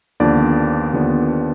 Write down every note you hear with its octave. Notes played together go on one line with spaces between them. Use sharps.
D#2 D3 F3 B3 D4 D5
D#2 D3 F3 B3 D4